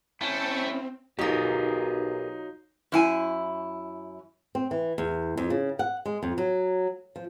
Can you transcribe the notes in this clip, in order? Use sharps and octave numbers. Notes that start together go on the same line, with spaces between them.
A3 C4 C#4 E4 G5 A5
B1 F#3 D#4 F4 G4 G#4 A#4
F#2 E4 G#5
C4
E3
E2
F2
C#3
F#5
G#3
F2
F#3
F3